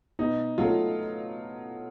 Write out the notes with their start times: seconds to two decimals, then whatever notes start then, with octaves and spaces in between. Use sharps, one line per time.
0.19 B2 D#4
0.58 F#3 A3 F4